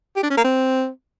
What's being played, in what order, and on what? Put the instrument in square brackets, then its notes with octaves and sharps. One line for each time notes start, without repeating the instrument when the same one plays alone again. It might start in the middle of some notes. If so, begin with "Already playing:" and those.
[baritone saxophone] G4
D4
C#4
A#3
C4